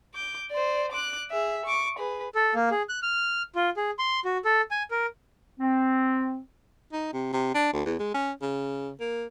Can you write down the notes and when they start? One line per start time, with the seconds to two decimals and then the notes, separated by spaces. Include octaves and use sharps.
0.15 D6 G6
0.51 C5 D5
0.92 D6 F#6
1.31 G#4 E5
1.66 C#6 D6
1.99 G#4 B4
2.35 A4
2.55 A#3
2.71 G#4
2.89 F#6
3.02 F6
3.55 F4
3.77 G#4
3.99 C6
4.25 F#4
4.45 A4
4.71 G#5
4.91 A#4
5.60 C4
6.92 D#4
7.13 C3
7.33 C3
7.55 D4
7.73 D2
7.85 E2
7.99 G#3
8.14 C#4
8.42 C#3
9.00 A#3